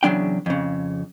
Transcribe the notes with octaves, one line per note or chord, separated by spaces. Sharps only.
E2 C#3 F#3 D4 G5
F2 C#3